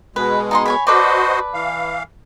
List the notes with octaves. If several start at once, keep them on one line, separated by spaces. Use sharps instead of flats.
B2 G#3 B4
D#4 D#5 C6
C#5 G#5 B5
F#4 A4 B4 C5 D5 D#5
E3 F5